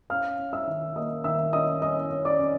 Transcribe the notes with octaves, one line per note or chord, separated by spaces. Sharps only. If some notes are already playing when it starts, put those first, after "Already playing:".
C#4 F5 F6
C#4
E5 E6
D#3
A#3 D#5 D#6
D#3 E5 E6
C#4 D#5 D#6
C#4 D#5 D#6
C#4
D5 D6
C#4